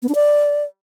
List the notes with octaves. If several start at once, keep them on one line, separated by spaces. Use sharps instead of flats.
B3
D4
D5